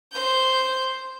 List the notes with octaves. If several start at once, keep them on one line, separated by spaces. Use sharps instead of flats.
C5 G6